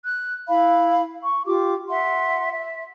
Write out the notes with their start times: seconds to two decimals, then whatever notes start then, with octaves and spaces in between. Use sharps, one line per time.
0.03 F#6
0.48 E4 F5 B5
1.24 C#6
1.45 F4 G4 D6
1.89 E5 F#5 C6
2.52 E5